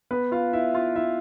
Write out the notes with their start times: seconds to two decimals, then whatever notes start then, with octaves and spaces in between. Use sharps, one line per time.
0.11 B3 B4
0.32 F4 F5
0.53 E4 E5
0.74 F4 F5
0.96 E4 E5